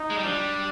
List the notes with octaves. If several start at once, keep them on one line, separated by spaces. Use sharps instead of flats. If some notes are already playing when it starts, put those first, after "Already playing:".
Already playing: D#4
G#3
G3
F3 D4
G3